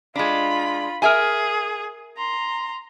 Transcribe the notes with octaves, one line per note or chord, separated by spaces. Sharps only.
G#3 D4 F4 B5
G#4 A#4 E5 G#5
A#5 C6